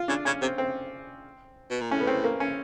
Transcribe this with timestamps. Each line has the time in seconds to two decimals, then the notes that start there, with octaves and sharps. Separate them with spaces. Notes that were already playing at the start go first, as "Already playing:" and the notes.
Already playing: F4
0.08 C#3 D4
0.25 C#3 C#4
0.42 C3 C4
0.58 C4
1.70 B2
1.81 A#2
1.91 A2 C#4
2.00 B3
2.07 C4
2.24 A#3
2.40 C#4